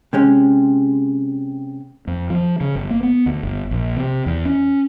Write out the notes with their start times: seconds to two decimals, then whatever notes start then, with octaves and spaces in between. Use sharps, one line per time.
0.13 C3 G#3 C#4
2.07 F2
2.30 F3
2.61 C#3
2.75 G1
2.91 A#3
3.03 B3
3.26 D2
3.43 G1
3.71 A#1
3.97 C3
4.26 E2
4.45 C#4